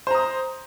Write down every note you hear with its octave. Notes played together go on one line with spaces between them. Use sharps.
C5 A#5 D#6